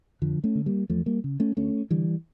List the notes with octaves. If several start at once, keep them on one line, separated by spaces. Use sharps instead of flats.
F2 D3 F3
A3 C#4
D3
G3 A#3
E2 F3 A3
G3 A#3
C#3
A3 C#4
D2 A3 C#4
D3 E3 G3